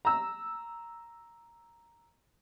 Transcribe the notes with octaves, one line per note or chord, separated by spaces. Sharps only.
A#5 E6